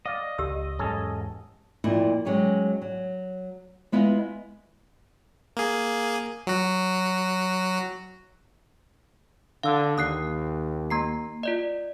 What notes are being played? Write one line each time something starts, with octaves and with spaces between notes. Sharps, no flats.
D5 D#5 F5
C#2 G4 E6
E2 G#2 F#3 C#4 G#4 A4
F2 A#2 D#4 E4
F#3 G#3 C#4 D#4 G4
F#3
G#3 B3 E4 F4 D#5 F5
A#3 G#4
F#3 F#4
D3 F5 E6
D#2 D#6 F#6 C7
A#3 A#5 C7
F4 D5 D#5